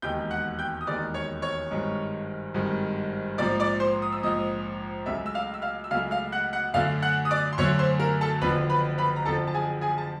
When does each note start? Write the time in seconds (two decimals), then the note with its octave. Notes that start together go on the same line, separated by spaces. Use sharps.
0.02 E1 D#2 D#3 G#3 G5 G6
0.31 F#5 F#6
0.59 G5 G6
0.81 D#6
0.87 E1 D#2 D#3 G#3 D5 D6
1.14 C#5 C#6
1.42 C#5 C#6
1.71 G#1 G2 D#3 G#3
2.54 G#1 G2 D#3 G#3
3.38 A#1 G#2 F3 D5 D6
3.60 D5 D6
3.80 C5 C6
4.02 D#6
4.12 E6
4.23 A#1 G#2 F3 D#5 D#6
5.06 C#2 C#3 F#3 A3 E5 E6
5.26 E6
5.35 F5 F6
5.54 E6
5.62 F5 F6
5.84 E6
5.91 C#2 C#3 F#3 A3 F5 F6
6.11 F5 F6
6.32 F#5 F#6
6.53 F#5 F#6
6.74 F#2 D3 F#3 A3 F5 F6
7.02 F#5 F#6
7.25 D#6
7.31 D5 D6
7.53 C6
7.58 F#2 D3 F#3 A3 C#5 C#6
7.79 C5 C6
8.00 A#4 A#5
8.21 A4 A5
8.42 F#1 F2 D3 F3 B4 B5
8.70 B4 B5
8.98 B4 B5
9.16 A#5
9.25 F#1 F2 D3 F3 A4 A5
9.47 A5
9.54 G#4 G#5
9.81 G#4 G#5
9.98 A5